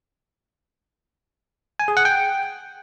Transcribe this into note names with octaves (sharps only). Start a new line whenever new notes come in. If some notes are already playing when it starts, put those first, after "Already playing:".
G#5
G#4
F#5
G5